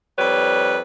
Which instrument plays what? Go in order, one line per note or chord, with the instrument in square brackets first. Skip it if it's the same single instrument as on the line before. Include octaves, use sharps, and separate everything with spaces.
[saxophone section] F2 G3 B4 C#5